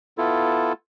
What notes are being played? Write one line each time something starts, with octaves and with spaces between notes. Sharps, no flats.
B3 E4 F4 A4